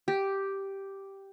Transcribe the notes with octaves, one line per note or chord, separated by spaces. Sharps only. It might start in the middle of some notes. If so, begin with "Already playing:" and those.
G4